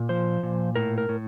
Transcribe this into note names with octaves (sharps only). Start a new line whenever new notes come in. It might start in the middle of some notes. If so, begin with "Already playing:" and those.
Already playing: A#2
F3 C5
A#2
A2 A#4
A#4
A2